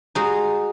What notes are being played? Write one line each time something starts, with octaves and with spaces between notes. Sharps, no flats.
G#3 D#4 F#4